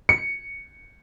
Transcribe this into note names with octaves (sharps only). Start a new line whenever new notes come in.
C#7